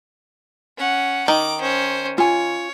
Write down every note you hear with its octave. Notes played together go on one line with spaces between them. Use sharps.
C#4 F#5
D#3 A#5 D6
C#4 C5
F4 C#5 G#5